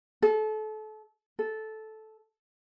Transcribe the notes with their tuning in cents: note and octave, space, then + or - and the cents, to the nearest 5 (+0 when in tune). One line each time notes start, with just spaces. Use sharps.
A4 -30
A4 -10